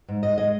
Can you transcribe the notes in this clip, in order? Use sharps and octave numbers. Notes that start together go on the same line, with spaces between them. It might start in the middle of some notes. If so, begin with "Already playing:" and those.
G#2
G#2 D#5
G#3 D#5